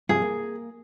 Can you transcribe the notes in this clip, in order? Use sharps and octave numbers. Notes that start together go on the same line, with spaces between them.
G2 C3 F3 G#4
A#3